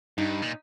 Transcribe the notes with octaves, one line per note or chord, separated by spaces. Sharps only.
G2 D#4
A#2